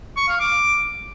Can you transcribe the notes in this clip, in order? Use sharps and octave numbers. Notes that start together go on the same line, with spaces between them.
C#6
F5
D6